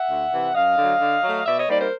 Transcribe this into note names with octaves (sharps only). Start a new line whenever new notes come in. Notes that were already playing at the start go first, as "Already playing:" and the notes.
Already playing: E5 F#5
D2
C3 E3
F#2 D#5 F5
D3 F#3
D3
F#3 A3
B2 D5 E5
C#5 D#5
G3 A#3 D#4 C5 D5
A#4 C5